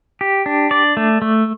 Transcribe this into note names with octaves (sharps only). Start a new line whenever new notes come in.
G4
D4
D5
A3
A3